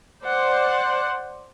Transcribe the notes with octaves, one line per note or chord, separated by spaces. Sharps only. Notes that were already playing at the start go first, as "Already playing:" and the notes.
C5 D5 F#5